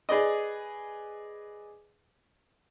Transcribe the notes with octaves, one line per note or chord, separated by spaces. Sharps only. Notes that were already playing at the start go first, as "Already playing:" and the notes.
G#4 B4 D5 D#5